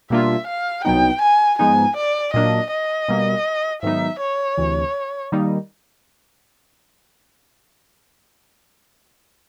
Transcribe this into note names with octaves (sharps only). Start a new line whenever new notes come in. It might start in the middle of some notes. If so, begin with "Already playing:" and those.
B2 G3 A#3 D4 F4 E5
F5
C2 B2 F#3 B3 D#4 G5
G#5
G#2 F3 G#3 B3 D#4 G#5
D5
A#2 F#3 A#3 D4 D#5
D#5
B2 G3 A#3
G#2 D#3 F#3 B3 D#4 E5
C#5
D2 C3 E3
D#3 G3 A#3 D#4